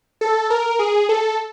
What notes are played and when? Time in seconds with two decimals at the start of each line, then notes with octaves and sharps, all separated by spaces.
0.21 A4
0.50 A#4
0.79 G#4
1.09 A4